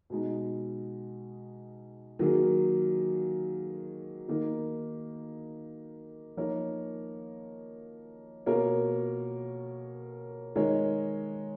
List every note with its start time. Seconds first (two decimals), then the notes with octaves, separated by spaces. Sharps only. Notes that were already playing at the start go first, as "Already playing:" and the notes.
0.10 B2 G#3 D#4
2.19 D#3 F#3 A#3 F4 G#4
4.28 D#3 A#3 D#4
6.37 F3 A#3 D#4 A#4 C#5
8.46 B2 A#3 F4 A#4 C#5
10.55 D#3 G#3 D#4 A#4 C#5